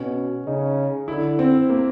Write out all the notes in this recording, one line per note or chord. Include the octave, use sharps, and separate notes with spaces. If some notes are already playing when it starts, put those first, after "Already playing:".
Already playing: B2 C#4
C#3 D#4
D3 E4
C4
A#3